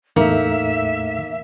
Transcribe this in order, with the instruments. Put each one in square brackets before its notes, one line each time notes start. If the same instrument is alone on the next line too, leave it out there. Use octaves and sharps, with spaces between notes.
[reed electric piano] E2 A2 A3 [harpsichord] A#3 [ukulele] D#4 [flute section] E5